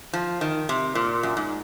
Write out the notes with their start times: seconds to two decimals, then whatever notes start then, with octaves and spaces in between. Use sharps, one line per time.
0.13 F3
0.41 D#3
0.69 C3
0.95 A#2
1.23 F#2
1.37 G#2